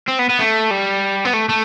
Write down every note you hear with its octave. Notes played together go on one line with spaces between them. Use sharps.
C4
B3
B3
A3
G3
B3
A3
A3